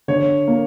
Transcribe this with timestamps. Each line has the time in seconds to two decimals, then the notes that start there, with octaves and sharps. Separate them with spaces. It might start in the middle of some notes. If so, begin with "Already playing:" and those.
0.08 D3 C#5
0.48 A#3